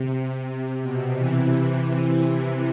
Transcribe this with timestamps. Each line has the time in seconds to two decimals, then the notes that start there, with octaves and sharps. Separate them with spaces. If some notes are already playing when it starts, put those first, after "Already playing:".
Already playing: C3
0.49 C3
0.83 B2
1.17 C3 E3
1.85 C3 E3